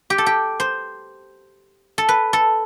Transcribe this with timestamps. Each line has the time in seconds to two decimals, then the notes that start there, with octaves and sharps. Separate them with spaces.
0.10 G4
0.18 A4
0.26 G4
0.60 C5
1.98 A4
2.09 B4
2.33 A4